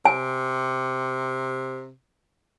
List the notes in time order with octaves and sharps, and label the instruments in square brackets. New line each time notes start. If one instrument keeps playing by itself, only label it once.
[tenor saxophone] C3 [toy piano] G#5